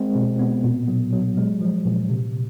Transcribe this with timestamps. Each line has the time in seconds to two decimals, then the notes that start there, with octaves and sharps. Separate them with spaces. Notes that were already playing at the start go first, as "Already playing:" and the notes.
Already playing: G#3 C4
0.15 B2
0.39 B3
0.64 A#2
0.88 F#3
1.13 F#3
1.37 G#3
1.61 F3
1.85 A#2
2.10 C3